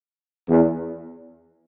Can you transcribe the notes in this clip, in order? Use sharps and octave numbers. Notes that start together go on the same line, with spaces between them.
E2